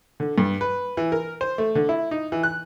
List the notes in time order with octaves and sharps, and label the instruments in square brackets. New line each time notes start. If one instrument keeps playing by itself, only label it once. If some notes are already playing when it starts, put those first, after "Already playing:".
[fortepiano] D3
G2
B4
E3
A#4
C5
A3
D3
E4
D#4
E3
F#6